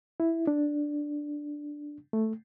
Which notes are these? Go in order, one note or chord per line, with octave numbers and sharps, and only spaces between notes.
E4
D4
A3